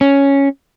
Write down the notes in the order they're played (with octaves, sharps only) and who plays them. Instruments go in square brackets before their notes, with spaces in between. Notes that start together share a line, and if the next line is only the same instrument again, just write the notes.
[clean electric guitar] C#4